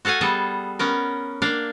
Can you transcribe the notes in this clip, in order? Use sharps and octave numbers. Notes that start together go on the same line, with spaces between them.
F#4 A4 F5 F#5 G#5
G3 B3 G#4 A4
B3 C#4 A#4
A#3 D4 D5 F5